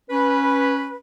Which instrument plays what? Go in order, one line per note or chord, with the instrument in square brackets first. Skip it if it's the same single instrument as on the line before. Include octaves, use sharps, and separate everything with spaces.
[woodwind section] C#4 B4